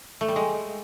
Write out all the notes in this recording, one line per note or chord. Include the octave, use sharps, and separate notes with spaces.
A3
G3
G#3